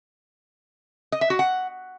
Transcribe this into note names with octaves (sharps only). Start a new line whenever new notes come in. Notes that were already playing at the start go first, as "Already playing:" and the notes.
D#5
E5
F#4
F#5